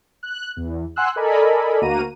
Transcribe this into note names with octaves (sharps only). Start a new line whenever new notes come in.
F#6
E2
F#5 G#5 C6 E6 F#6
A4 A#4 D5 D#5 G#5 B5
D2 A#3 F#4 A#5 D#7